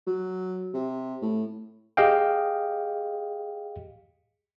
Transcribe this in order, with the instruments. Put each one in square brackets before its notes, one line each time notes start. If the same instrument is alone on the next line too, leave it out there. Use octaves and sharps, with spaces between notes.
[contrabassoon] F#3
C3
A2
[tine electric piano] G4 G#4 D#5 F5 G5